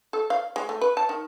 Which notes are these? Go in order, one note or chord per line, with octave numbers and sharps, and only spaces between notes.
A4
F5
G#3
A3
B4
A5
D#3